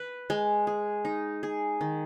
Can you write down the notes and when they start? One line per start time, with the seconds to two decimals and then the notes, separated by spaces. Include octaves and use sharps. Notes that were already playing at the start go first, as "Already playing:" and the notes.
Already playing: B4
0.30 G#3
0.67 G#4
1.05 D#4
1.43 G#4
1.81 D#3